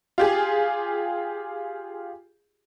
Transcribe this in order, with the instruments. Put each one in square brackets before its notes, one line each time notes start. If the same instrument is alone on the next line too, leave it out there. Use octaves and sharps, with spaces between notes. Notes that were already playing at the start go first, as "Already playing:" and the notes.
[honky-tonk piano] F4 G4 G#4